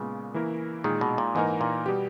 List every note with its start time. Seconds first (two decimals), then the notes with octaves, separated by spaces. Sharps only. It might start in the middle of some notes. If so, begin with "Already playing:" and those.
Already playing: A#2 C#3 G#3 B3
0.34 E3 A#3 E4 A#4
0.84 A#2 D#3 G#3 D#4 G#4
1.01 B2
1.18 A#2
1.35 G#2 E3 A#3 D#4 A#4
1.61 A#2
1.86 B2 G3 B3 G4